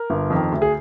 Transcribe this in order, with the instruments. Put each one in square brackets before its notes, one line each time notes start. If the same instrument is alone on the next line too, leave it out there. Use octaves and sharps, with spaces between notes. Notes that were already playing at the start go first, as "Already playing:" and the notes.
Already playing: [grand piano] A#4
[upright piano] G1
F2 D#3
D2
[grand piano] G#4